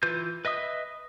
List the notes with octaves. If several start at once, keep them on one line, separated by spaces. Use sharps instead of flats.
E3 F4 B4 G6
B4 D#5 E5 D#6